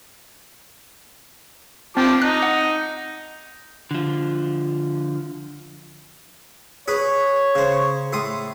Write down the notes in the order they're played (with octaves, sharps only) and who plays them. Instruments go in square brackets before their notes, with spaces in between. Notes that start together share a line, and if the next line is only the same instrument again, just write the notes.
[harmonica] F3 A5 D6 [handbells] C4
[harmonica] D#4 [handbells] F#6
[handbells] F#5
[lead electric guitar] D3 F3
[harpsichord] G#4 B4 [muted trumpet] C#5
[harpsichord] C#3 C5
A2 C6 D#6